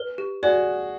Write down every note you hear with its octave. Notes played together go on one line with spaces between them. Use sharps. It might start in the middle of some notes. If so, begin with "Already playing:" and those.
Already playing: B4
G4
F#4 G#4 D5